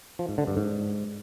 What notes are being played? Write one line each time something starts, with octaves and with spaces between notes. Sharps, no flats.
F3
G#2
D3
G2
G#2